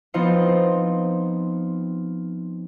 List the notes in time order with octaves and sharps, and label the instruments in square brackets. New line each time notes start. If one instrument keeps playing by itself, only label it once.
[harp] F3 B3 C4 D#4 F4 C5